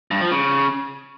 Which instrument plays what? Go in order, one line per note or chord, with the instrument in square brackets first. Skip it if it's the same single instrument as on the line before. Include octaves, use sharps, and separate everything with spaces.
[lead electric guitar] G2
F3
C#3